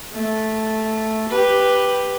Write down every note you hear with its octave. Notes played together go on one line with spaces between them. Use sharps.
A3
G4 B4